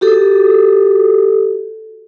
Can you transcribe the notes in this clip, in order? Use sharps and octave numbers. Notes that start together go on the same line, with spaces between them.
F#4 G4 A4